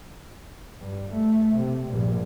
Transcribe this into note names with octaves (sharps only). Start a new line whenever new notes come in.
G2
A3
C3
A#1 G2